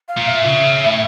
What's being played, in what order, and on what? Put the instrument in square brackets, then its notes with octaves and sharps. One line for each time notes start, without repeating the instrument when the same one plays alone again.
[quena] F5
[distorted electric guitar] A#2
[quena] E5
[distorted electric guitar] C#3
A2